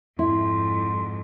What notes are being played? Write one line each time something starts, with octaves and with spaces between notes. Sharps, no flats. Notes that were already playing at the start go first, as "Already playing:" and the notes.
F2 G#2 E4 C6